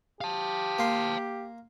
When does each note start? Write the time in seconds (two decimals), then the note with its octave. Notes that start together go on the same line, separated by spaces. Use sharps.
0.21 G4 F5 A5
0.79 A#3 C6